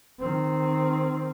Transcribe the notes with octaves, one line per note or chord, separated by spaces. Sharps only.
D#3 C4